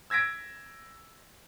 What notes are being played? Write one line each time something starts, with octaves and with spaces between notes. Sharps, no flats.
E6 G#6 A#6 B6 D7